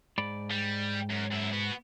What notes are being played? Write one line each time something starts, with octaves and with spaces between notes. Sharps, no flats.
G#2 D5 B5
G3
F#2
F#2 E4
B3 F#4